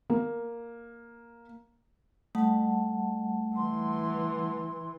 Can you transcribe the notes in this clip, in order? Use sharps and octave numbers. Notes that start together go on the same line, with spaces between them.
A#3
G3 A3 F#5 A5
E3 C6